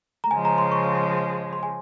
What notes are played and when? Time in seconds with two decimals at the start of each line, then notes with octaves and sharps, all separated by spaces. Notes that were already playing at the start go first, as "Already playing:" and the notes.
0.24 A#5
0.31 C#3 F3 G#3 G#5
0.45 A#5
0.58 C6
0.72 C#6
1.53 C6
1.63 G#5